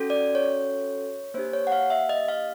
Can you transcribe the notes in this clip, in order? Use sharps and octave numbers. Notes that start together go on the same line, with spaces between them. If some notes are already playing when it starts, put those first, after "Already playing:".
Already playing: C#4 F#4 A4
D5
C#5
A#3 D4 G4 C5
C#5
F#5
F5
E5
D#5
F5